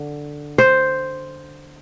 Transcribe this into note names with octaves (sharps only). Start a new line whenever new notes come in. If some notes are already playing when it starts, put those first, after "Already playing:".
Already playing: D3
C5